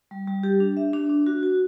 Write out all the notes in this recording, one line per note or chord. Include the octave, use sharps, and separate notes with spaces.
G3
G3
G4
D4
E5
D4
D4
F#4
F#4